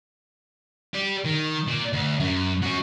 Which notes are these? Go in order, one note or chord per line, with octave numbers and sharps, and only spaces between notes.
G4 D5
D#3
A#2
D2
F#2
C#4 F#4